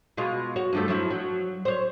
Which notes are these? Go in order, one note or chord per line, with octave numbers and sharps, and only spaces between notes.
B2 G#3 F4
F#4 C#5
G2 F3 A3
F3 F#3 E4
F#3
C5 C#5